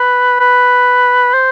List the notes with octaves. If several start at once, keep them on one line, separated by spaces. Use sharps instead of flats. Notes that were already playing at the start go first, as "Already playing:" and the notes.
Already playing: B4
B4
C5